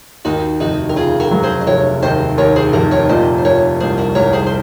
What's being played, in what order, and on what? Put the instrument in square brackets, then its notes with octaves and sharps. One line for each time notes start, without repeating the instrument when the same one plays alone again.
[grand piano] D#2 [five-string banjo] D#4 F#4
[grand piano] F1 [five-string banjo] D#4 F#4
[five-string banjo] A#4
[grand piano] C#3 [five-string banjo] F4 G#4
[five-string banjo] F#4 A#4
[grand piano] F#3
[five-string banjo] G#4 C5
D#5
[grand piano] F1 [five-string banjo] A#4 C#5
[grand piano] D#2 [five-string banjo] C5 D#5
[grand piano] D#2 [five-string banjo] A#4 C#5
[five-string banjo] G#4 C5
[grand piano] F1 [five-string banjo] F#4 A#4
[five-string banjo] A#4 C#5
[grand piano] A#2 [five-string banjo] C5 D#5
[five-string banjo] C5
[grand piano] A#2 [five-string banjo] A#4 C#5
[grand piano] C2 [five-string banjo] G#4 C5
[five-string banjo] F#4 A#4
[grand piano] C2 [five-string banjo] A#4 C#5
[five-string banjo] G#4 C5
C5